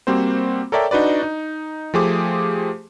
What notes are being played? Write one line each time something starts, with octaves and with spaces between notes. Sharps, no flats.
G3 A#3 C4 F#4 C5
A4 A#4 C#5 D5 E5 G5
D4 D#4 F#4 B4 D5
D#4
F3 A3 G4 G#4 C5 D6